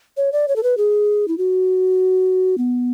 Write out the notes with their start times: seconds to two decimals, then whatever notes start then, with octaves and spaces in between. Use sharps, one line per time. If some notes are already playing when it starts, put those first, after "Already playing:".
0.17 C#5
0.32 D5
0.48 C#5
0.56 A4
0.63 B4
0.77 G#4
1.28 E4
1.38 F#4
2.58 B3